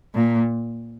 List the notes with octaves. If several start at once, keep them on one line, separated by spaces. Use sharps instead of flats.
A#2